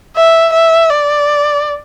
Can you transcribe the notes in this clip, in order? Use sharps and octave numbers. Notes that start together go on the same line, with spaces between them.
E5
E5
D5